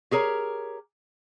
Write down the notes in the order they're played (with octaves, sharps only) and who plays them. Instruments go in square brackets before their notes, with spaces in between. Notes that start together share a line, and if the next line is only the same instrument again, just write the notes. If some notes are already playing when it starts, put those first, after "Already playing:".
[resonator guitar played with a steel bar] G4 G#4 A#4 C#5